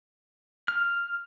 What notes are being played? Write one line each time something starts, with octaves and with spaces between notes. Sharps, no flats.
F6